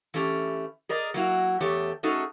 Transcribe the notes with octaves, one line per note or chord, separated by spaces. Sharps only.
E3 A3 C#4 G4
G#4 A#4 D5 D#5
F#3 A#3 E4 F#4
E2 A3 G4 C#5
A3 C#4 D#4 F#4 G#4 A4